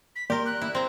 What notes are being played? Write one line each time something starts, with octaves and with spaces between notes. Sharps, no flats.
B6
A#3 G4 A#4 D5 C6
F#6
E4
C4 A#5